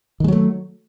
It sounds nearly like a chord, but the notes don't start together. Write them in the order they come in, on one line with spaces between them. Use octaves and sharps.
D#3 G#3 F#3 A3